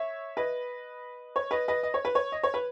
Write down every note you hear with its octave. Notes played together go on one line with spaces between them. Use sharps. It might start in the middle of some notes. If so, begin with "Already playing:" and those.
Already playing: C#5 E5
B4 D#5
C#5
B4 D#5
B4 D#5
D#5
C#5
B4
C#5
D#5
C#5
B4